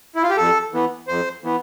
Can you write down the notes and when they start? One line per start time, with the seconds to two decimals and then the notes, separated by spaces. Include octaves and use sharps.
0.15 E4
0.23 F4
0.29 G4
0.37 F2 A4
0.73 E3 B3
1.08 F2 C5
1.43 E3 B3